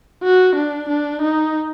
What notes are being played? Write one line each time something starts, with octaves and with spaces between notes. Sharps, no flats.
F#4
D4
D4
D#4